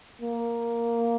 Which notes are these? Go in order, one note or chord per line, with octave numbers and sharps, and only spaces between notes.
A#3